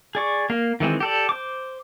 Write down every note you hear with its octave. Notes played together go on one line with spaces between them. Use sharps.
G#4 D5 C#6
A#3 F5
D#3 E3 G#3 C4
G4 A4 D5
C5 D6